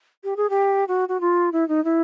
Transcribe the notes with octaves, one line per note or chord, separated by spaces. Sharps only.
G4
G#4
G4
F#4
F#4
F4
E4
D#4
E4